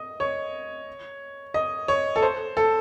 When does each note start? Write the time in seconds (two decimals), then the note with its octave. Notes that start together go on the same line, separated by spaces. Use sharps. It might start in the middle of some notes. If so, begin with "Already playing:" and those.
Already playing: D#5
0.20 C#5
1.54 D#5
1.88 C#5
2.16 A4
2.22 C5
2.57 A4